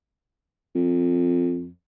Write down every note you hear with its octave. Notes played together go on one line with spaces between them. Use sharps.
F2